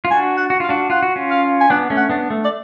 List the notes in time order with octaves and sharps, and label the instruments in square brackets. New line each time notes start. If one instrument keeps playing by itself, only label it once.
[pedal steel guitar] F4
[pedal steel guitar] D4 F#4 [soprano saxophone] G#5
[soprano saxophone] F#5
[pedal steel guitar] F#4
[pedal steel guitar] F4 [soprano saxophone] F5
[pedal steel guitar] D4 F#4
[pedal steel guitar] F4 [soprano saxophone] F#5
[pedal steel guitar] F#4
C#4 F4
[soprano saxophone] F5
G#5
[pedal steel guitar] B3 D4 [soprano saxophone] F#5
[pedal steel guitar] A3 C#4
[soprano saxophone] F#5
[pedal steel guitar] B3 D4
A3
[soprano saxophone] D5